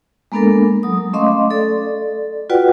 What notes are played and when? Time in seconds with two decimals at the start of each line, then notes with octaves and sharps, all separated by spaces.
0.32 G#3 A#3 B3 D4 A4 A#4
0.83 F#3 D#6
1.13 A3 C#4 D#5 F5 C6 D6
1.50 A4 D5
2.50 F4 F#4 B4 D5 F#5 G5